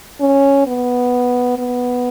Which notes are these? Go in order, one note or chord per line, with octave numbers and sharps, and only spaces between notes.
C#4
B3
B3